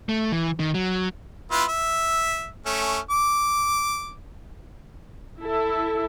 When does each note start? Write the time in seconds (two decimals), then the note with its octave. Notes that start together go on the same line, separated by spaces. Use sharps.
0.09 A3
0.32 E3
0.60 D#3
0.74 F#3
1.51 B3 E4 F4
1.69 E5
2.66 A3 C#4
3.11 D6
5.41 E4 A4